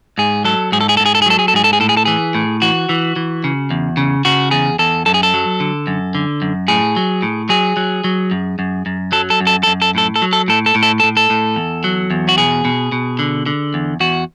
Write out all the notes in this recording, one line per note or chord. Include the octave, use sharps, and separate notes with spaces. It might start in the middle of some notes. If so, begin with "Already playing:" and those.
G#2 G#4
F#3 A4
G#2 G#4
A4
G#4
G#2 A4
G#4
A4
G#4
F#3 A4
G#4
A4
G#2 G#4
A4
G#4
A2 A4
G#4
A4
E3 G#4
A2
E3 F#4
E3
E3
C#3
E2
C#3
C#3 F#4
E2 G#4
E2 A4
F#2 A4
G#4
A4
F#3
D3
F#2
D3
F#2
A2 G#4
F#3
A2
F#3 G#4
F#3
F#3
F#2
F#2
F#2
F#3 A4
A4
F#2
A4
F#2 A4
A4
A2 A4
A4
F#3
A4
A2 A4
A4
A2
A4
A4
A2
A4
A2
E2
F#3
E2
F#4
B2 G#4
B2
B2
D3
D3
E2
E2 F#4